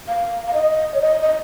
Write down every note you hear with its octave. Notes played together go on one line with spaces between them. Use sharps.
F5
F5
D#5
C#5
D#5
D#5